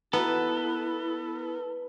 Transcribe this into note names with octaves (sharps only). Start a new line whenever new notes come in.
B3 E4 A4 B4